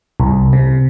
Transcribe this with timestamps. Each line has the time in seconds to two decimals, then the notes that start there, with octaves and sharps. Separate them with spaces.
0.20 C2
0.53 C3